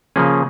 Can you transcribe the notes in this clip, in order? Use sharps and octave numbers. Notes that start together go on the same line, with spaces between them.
C#3 F3 A#3 C#4 G#4